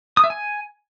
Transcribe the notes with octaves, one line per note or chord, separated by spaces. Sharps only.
D#6
E5
G#5